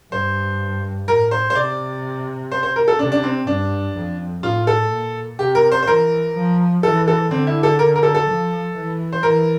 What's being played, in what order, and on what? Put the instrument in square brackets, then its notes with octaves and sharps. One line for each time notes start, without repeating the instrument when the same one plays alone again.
[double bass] G2 [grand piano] C5
[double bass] A2 [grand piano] A#4
[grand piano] C5
C5
[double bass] C3 [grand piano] D5
[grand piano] C5
C5
A#4
A4
[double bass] C3 [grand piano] D4
[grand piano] D4
C4
[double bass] G2 [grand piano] D4
[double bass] F2
[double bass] A2 [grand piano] F4
[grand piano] A4
[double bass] A#2
[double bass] C3 [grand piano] G4
[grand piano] A#4
C5
C5
[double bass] E3 [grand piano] A#4
[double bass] F3
[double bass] E3 [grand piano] A4
[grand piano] A4
[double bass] D3 [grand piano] C4
[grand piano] E4
A4
A#4
A#4
A4
A4
[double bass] F3
E3
[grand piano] C5
[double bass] E3 [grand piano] A#4